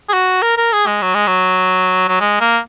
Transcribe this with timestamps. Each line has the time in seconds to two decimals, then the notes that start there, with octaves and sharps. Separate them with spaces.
0.09 G#4
0.13 F#4
0.42 A#4
0.57 A#4
0.73 G#4
0.87 G#3
1.02 F#3
1.14 G#3
1.27 F#3
2.09 F#3
2.20 G#3
2.40 A#3